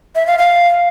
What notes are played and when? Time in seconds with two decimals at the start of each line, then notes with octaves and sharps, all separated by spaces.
0.15 E5
0.27 F5
0.39 F5